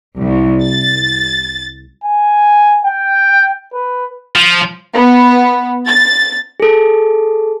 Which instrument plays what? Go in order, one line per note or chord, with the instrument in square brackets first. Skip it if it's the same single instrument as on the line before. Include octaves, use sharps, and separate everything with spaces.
[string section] C2
A6
[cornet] G#5
G5
B4
[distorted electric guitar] F3
[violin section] B3
A6
[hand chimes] G#4 A4